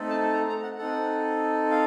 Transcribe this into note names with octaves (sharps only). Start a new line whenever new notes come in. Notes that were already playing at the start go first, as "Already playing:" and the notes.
Already playing: A3 C4 D#4 A4
A5
A#5
A#5
F#5
C4 D#4 A4 F#5
F5